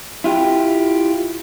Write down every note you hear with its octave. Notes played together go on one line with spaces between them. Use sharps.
E4 F4 G4